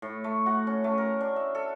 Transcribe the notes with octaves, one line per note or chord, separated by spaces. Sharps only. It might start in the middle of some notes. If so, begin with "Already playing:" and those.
A2
A3
F#4
C#4
A3
A#4
D4
E5
A4